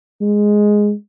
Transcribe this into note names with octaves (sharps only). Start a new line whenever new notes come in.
G#3